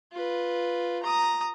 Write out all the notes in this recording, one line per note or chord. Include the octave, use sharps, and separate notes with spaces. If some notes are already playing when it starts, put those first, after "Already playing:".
F4 B4
A#5 D#6